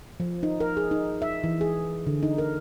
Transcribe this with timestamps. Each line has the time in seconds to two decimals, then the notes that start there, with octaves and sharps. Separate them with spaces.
0.20 F3
0.43 D#4
0.60 A#4
0.77 G#4
0.91 D#4
1.22 E5
1.44 E3
1.61 G#4
2.07 D3
2.23 D#4
2.38 A#4